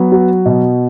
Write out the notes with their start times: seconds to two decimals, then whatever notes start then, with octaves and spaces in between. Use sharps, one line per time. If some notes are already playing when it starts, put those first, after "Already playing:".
Already playing: F#3 B3
0.12 F#4
0.46 B2